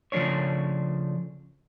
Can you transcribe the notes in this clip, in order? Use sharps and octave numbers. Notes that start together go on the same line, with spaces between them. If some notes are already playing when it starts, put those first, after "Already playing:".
C#3 F3 A3 D4 C#5